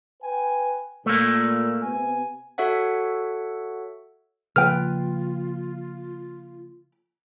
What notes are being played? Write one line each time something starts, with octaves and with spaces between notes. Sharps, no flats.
B4 G5 G#5
A#2 A3 A#3
C3 B3 G#5
F#4 A4 C#5 E5 F#5
C#3 F3 A#3 F4 B4 G5 F6